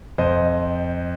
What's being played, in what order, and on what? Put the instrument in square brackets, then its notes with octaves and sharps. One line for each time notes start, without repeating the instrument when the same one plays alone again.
[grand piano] F2 C5 D#5